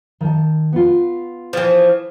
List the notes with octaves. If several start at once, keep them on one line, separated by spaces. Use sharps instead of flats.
D#3 A5
B3 F4
E3 F3